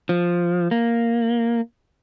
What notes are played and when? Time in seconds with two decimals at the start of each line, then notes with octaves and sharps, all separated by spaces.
0.09 F3
0.71 A#3